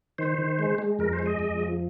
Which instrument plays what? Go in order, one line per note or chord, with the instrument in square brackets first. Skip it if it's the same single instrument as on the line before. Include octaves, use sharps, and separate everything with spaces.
[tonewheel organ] D#3 C5
D#3
G#3
G#3
F2 A#4
C5
G#3
D#5
F2
F3